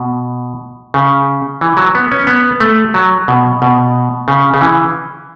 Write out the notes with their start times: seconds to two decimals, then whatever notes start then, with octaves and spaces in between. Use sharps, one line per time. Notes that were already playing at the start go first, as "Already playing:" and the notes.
Already playing: B2
0.94 C#3
1.61 E3
1.77 F#3
1.95 B3
2.11 C#4
2.27 B3
2.60 A3
2.94 F#3
3.28 B2
3.62 B2
4.28 C#3
4.54 C#3
4.61 E3